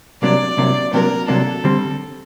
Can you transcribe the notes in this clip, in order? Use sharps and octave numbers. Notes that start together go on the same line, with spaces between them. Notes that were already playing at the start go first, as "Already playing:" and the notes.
C2 C3 F#3 A#3 D4 D5
C2 C3 F#3 A#3 D4
C2 C3 F#3 A#3 D4 A#4
C2 C3 F#3 A#3 D4 A4
D3 G3 C4